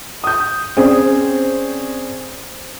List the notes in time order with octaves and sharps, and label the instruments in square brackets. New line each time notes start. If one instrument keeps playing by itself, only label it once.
[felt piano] D#6 G6
[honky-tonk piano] C4 [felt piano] C#4 G#4 D5